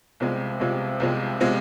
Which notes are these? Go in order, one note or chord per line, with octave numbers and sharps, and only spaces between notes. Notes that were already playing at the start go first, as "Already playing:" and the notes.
C2 C3 F3 G#3
C2 C3 F3 G#3
C2 C3 F3 G#3
C3 F3 G#3